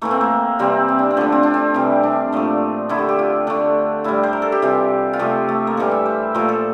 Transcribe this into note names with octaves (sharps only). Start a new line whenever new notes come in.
A2 E3 A3 A#3
C4
A#3
C3 E3 G3 C4
C4
D4
C4
D3 F3 A3 D4
C4
D4
C4
C3 E3 G3
D4
A#2 F3 A3
D3 A3 E4
G4
G4
F4
D3 A3 D4
A2 G3 E4
C5
A#4
A4
G4
C3 E3 G3 F4
F4
C3 F3 A3 G4
A3
A#3
A2 E3 G3 A4
E5
C5
A#2 F3 A3 A#4
A4